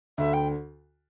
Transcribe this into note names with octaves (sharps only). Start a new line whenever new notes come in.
D2 D3 E5
G5